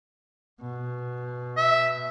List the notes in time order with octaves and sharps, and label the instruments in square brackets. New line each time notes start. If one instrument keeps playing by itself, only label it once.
[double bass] B2
[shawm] E5